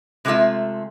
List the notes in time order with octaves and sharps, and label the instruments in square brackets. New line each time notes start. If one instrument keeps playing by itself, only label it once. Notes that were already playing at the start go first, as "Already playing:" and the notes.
[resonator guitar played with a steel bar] C3 G#3 A3 B3 F4 E5